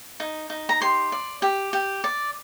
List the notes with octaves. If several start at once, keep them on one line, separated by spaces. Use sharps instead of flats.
D#4
D#4
A#5
G4 C6
D5
G4
G4
D5